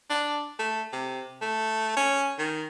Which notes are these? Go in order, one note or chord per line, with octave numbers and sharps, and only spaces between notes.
D4
A3
C3
A3
C#4
D#3